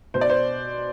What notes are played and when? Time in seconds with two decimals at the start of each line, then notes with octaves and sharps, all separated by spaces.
0.14 B2 C5
0.21 D5
0.30 C5